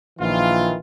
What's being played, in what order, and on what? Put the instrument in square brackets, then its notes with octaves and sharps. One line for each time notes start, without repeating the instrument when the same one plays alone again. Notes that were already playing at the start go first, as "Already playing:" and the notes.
[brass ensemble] A#1 D#3 E3 F4